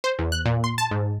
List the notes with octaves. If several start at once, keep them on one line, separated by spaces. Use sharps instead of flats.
C5
E2
F#6
A#2
C6
A5
G#2